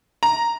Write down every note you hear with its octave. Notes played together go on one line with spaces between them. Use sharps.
A#5